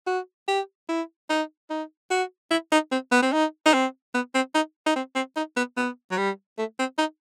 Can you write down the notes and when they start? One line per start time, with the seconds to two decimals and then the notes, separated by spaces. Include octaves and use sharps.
0.07 F#4
0.48 G4
0.89 E4
1.30 D#4
1.70 D#4
2.11 F#4
2.51 E4
2.72 D#4
2.92 C4
3.12 B3
3.22 C4
3.32 D#4
3.66 D#4
3.73 C4
4.14 B3
4.35 C4
4.55 D#4
4.86 D#4
4.96 C4
5.15 C4
5.36 D#4
5.56 B3
5.77 B3
6.11 F#3
6.18 G3
6.58 A3
6.79 C4
6.98 D#4